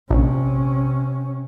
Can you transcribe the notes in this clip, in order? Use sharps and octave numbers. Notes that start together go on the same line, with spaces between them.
A#1 C3 C#4